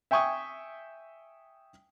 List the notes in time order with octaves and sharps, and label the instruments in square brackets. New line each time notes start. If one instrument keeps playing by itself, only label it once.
[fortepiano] E5 G5 G#5 C#6 D#6